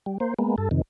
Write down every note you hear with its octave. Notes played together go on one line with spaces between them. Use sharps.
G3
A#3 C5
G#3 A#3 B3
G2 A4
F2 C3 D#3